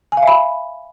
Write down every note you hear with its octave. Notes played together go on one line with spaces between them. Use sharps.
G#5
F5
E5
B5